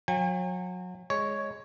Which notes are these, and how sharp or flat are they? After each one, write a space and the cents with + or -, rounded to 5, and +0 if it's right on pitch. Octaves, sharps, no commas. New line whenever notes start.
F#3 -30 G#5 -45
G#3 +0 C#5 +0